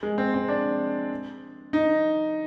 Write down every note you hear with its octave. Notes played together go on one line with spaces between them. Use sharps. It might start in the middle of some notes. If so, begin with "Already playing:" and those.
G#3
C4
C4
D4
D#4